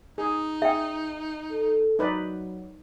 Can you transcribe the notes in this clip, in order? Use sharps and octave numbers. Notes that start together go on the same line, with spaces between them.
D#4 G#4
G#4 E5 G5
A4
F#3 D#4 B4 D5